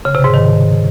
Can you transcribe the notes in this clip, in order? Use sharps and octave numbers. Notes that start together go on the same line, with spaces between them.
C#3
C3
G#2
D#3